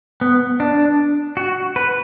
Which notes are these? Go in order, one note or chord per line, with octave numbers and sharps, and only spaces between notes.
B3
D4
F#4
B4